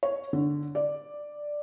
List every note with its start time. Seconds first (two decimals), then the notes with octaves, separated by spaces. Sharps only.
0.03 C#5
0.33 D3
0.75 D5